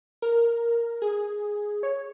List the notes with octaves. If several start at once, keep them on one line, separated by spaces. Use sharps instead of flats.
A#4
G#4
C#5